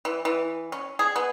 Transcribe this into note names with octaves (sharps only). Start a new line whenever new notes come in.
E3
E3
C#4
G#4
B3